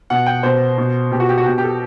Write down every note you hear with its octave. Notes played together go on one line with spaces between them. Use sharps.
B2 F#5
G5
B2 C5
B2
B2 G4
F#4
G4
F#4
B2 G4
G4
A4